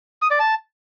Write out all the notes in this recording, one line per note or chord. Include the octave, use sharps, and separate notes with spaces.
D#6
D5
A5